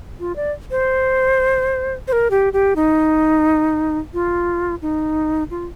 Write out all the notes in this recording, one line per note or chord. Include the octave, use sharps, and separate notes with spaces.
F4
D5
C5
C5
A#4
G4
G4
D#4
F4
D#4
F4